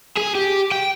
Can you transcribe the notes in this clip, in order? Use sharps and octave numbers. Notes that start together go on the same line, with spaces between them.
G#4
G4
G5